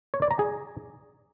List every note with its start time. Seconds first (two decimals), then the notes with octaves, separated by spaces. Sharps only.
0.14 C#5
0.22 D5
0.31 A#5
0.39 G#4